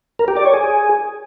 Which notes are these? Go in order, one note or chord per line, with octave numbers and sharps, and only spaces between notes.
A#4
G4
D5
C#5
G#4